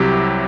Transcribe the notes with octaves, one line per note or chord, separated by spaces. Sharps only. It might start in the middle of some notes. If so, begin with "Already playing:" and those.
Already playing: C2 C3 F#3 E4 G4